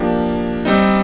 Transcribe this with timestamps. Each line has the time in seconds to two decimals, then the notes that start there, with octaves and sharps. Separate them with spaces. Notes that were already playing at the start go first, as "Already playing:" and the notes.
Already playing: F3 A#3 D4 G4
0.65 G3 C4 D#4